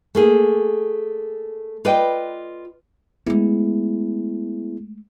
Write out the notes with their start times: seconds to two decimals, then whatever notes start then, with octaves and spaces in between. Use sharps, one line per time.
0.15 A3 A#3 G#4
1.85 F4 B4 D5 D#5 G5
3.26 G#3 A3 B3 E4 G#4